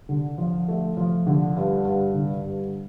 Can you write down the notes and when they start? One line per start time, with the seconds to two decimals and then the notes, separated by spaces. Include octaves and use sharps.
0.09 D3
0.38 F3
0.68 A3
0.97 F3
1.27 D3
1.57 G2
1.85 G2
2.14 D3
2.44 G2